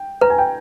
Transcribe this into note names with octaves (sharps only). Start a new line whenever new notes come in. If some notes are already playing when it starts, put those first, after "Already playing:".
Already playing: G5
B4 A#5
G#5
G5